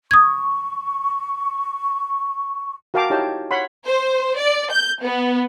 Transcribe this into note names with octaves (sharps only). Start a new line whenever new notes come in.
C#6 D#6 G#6
F#4 A#4 F5 G5 A5 D6
D#4 E4 G4 C#5 G5 A5
C#5 F#5 B5 C6
C5
D5
G6
B3